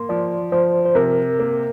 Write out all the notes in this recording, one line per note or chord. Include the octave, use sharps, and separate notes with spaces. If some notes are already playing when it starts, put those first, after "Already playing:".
Already playing: A#3 C6
F3 D5
F3 C5
C5
C3 A#4
A#3